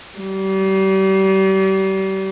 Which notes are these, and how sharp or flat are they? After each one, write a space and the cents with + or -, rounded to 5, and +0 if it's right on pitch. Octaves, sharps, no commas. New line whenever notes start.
G3 -35